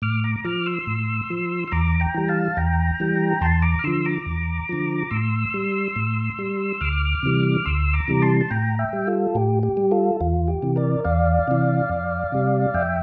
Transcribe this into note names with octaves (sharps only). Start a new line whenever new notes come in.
A2 D6 F6
A#5 D6
F3 D6 F6
C6 E6
A2
F3
E6
E2 A#5 D6
G5 A#5
E3 G3
F5 A5
E2 G5 A#5
E3 G3
E2 A5 C6
A#5 D6
F6
D3 F3 C6 E6
A#5 D6
E2
D3 F3
A2 C6 E6
G3
A2
G3
D2 D6 F6
C3 E3 G3
D2 C6 E6
A#5 D6
C3 E3 G3
A5 C6
A5
A2 G5 A#5
E5 G5
G3
F4 A4
A2 G4
G4
G3
F4 A4
E2 F4
G4
C3 E3
A#4 D5
E2 D5 F5
C3 E3
F2
C3 G3
F2 E5 G5